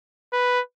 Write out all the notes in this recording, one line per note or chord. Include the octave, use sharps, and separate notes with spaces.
B4